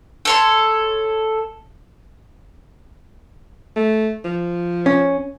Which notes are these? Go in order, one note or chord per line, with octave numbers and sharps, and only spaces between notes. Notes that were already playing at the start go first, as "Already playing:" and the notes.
A4 C#5 C6
A3
F3
C#4